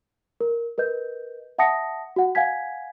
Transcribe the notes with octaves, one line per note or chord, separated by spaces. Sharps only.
A#4
A#4 B4 D#5 G6
E5 F#5 A5 D#6 A#6 C#7
F#4 F#5
F5 F#5 G#5 G#6 B6